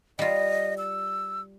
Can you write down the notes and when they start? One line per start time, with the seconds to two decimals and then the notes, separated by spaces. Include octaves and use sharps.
0.19 G3 F4 D#5
0.78 E6